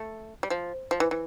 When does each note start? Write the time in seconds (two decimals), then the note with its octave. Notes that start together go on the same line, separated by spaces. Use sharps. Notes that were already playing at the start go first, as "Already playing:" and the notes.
Already playing: A3
0.43 G3
0.50 F3
0.91 F3
1.00 E3
1.11 E3